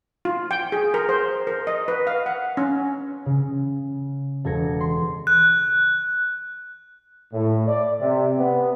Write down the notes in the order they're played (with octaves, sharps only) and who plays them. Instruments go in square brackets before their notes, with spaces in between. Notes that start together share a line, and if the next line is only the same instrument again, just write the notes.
[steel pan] F4
G5
G#4
A#4
C5
A#4
D#5
B4
F5
F#5
C#4
[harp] C#3
E1 A4 G#6 A#6 C#7
C6
[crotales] F#6
[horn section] A2
D5
C3
B3